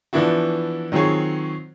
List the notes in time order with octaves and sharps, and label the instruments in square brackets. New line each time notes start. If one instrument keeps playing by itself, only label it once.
[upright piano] E3 F3 B3 D4 E4 F#4
D#3 F#3 C4 F4 G#4 C#5